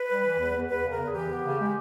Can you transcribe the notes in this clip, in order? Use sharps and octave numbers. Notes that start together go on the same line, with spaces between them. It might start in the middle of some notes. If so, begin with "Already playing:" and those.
Already playing: B4
G3
E3
E2
E2
E2 B4
C#3
A#4
E2
G#4
E3 G4
B3
C#3
G#3